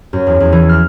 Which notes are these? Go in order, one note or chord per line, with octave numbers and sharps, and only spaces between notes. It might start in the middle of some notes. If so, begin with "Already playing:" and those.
F#2
E2
E2
E3
F6